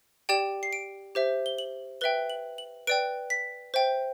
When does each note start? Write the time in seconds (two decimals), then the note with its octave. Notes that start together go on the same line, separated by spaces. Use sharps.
0.29 G4 D5 G5 E7
0.63 C7
0.73 D7
1.15 G4 C5 E5
1.46 G7
1.58 F#7
2.01 B4 E5 G5 G7
2.30 F#7
2.58 F#7
2.87 B4 D5 G5 D7
3.30 B6
3.74 C5 E5 G5